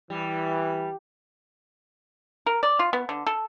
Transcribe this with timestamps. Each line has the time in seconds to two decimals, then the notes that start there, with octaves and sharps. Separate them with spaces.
0.10 E3 G3
2.46 A#4
2.63 D5
2.79 F4
2.93 B3
3.09 D3
3.27 A4